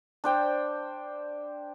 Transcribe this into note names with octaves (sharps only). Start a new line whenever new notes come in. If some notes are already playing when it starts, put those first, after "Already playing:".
D4 C5 G5